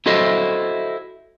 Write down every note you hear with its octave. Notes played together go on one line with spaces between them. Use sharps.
E4 F#4 A4 C5 D#5 E5